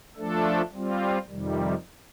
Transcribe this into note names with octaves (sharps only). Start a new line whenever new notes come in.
F3 A3 D4 A4
G3 C4 F4
F2 C3 D#3 G3